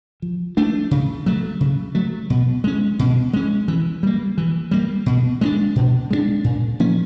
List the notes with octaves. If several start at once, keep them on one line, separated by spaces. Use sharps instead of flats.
F3
A3 D4
C#3
F#3 A3
C#3
F#3 A3
B2
G#3 C#4
B2
G#3 C#4
E3
G3 A#3
E3
G3 A#3
B2
G#3 B3 D4
B2
G#3 B3 D4
A#2
F3 A#3 C#4